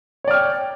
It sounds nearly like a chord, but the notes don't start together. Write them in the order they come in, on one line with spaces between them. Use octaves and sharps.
C#5 D5 F6 G5